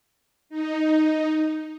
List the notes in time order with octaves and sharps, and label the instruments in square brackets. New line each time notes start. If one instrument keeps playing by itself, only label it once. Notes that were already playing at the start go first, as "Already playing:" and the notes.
[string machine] D#4